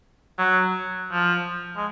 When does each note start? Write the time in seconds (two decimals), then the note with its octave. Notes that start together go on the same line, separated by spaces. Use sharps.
0.38 F#3
1.12 F3
1.76 G#3